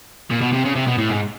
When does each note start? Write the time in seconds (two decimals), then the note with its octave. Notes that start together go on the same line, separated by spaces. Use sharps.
0.30 A#2
0.41 B2
0.53 C3
0.65 C#3
0.75 C3
0.87 B2
0.98 A2
1.10 G#2